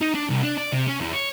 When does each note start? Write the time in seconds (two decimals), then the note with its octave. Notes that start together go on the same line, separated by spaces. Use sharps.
0.01 D#4
0.14 D4
0.30 C2
0.43 D4
0.57 D5
0.72 C3
0.87 C#4
1.00 E2
1.13 C#5